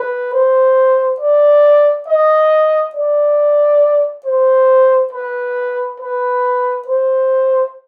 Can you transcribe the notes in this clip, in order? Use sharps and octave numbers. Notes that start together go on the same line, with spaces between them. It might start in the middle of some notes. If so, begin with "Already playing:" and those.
Already playing: B4
C5
D5
D#5
D5
C5
B4
B4
C5